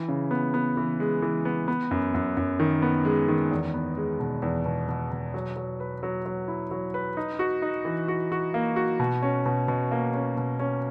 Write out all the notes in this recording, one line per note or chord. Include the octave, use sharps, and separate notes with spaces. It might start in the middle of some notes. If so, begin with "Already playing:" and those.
Already playing: E3
C#3
B3
B3
E3
G#3
E3
B3
B3
F#2
F#2
F#2
D#3
B3
G#3
D#3
E2
B3
G#3
B2
E2
B2
B2
B2
F#3
F#3
B4
F#3
F#3
E4
F#3
B4
D#4
F#4
D#4
E3
F#4
F#4
A#3
F#4
B2
C#4
B2
B2
A#3
C#4
B2
C#4